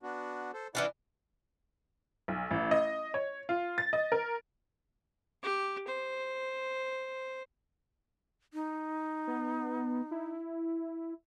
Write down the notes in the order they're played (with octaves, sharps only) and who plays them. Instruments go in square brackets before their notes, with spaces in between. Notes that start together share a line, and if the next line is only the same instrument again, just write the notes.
[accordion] B3 D4 F#4
A4 C5
[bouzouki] E3 C#4 D4 [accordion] E4 D5 F#5
[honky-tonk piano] B1
A1
D#5
C#5
F4
A6
D#5
A#4
[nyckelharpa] G4
C5
[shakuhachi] D#4
[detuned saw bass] B3
E4